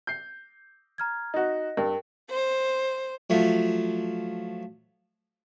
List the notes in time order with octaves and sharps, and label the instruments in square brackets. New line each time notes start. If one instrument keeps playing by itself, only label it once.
[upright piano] G6 C7
[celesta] A#5 F6 G#6
[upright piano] D#4 F#4 [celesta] D#5 A#6
[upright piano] G2 [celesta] A#4 G5
[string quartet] C5
[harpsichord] F3 F#3 A3